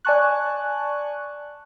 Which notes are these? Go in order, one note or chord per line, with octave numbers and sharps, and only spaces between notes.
D5 G#5 A5 C#6 F#6